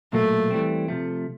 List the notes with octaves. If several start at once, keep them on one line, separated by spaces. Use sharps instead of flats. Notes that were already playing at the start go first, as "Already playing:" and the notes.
B1 A#2 F#3 A3 A#3
E3 G3 C4
C3 F3 A3